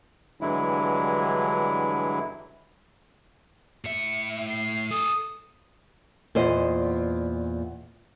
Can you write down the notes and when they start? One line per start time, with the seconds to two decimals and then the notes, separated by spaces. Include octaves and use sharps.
0.41 G2 D3 E3 F#3 G#3 E4
3.84 A2 E5 C#7
4.50 C7
4.91 A4 G#5 D#6
6.35 E2 A#2 C5 D#5